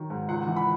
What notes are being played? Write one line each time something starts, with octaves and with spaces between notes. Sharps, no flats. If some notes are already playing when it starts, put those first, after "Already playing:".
Already playing: D#3 F#3
G#2
C#2 F#5
E3
B5